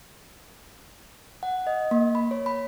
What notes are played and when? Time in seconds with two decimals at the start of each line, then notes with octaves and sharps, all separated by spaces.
1.43 F#5
1.67 D#5
1.91 A#3
2.15 B5
2.31 C#5
2.46 B5